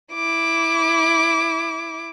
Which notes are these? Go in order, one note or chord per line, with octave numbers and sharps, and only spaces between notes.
E4 D6